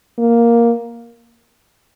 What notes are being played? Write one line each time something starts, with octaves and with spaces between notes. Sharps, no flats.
A#3